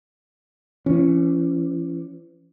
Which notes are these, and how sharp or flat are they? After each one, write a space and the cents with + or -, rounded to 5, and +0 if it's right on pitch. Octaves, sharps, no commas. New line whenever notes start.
E3 +40 C#4 +0